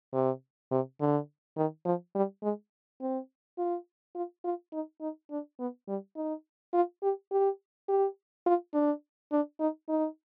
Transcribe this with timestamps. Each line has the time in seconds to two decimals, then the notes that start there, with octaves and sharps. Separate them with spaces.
0.13 C3
0.71 C3
1.00 D3
1.57 D#3
1.85 F3
2.15 G3
2.43 G#3
3.01 C4
3.58 F4
4.15 F4
4.44 F4
4.73 D#4
5.01 D#4
5.31 D4
5.59 B3
5.88 G3
6.16 D#4
6.73 F4
7.03 G4
7.31 G4
7.88 G4
8.46 F4
8.74 D4
9.32 D4
9.60 D#4
9.89 D#4